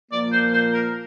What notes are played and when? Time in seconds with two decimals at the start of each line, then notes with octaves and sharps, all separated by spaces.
0.12 A#2 F3 A#3 D5
0.32 C5
0.53 C5
0.73 A#4